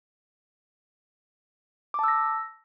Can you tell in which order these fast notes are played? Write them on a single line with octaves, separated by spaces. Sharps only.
D6 A5 E6 A#6